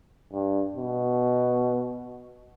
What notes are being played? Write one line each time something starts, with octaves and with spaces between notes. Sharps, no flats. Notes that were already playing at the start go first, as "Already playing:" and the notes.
G2
B2